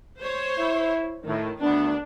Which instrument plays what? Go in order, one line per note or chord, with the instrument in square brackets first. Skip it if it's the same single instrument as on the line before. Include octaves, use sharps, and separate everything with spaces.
[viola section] C5 C#5
[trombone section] E4
[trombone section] A2 [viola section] D#3
[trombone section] D2 B3 [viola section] D4